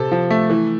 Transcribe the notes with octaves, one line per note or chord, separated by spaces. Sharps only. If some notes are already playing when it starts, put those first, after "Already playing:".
Already playing: C3 A4
F3
A3
E3